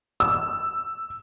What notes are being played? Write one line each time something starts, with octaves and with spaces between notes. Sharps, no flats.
E6